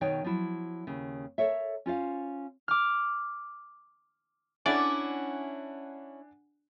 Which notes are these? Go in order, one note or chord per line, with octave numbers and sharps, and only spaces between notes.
B2 D#3 D#4 B4 C#5 G5
F3 F#3 E4
D#2 C#3
A4 A#4 C#5 E5
C#4 F4 C5 F5
D6 F6
C#4 D4 E4 D5 F#5 G#5